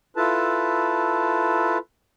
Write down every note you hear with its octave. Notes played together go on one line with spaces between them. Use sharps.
E4 F4 A4 B4 A5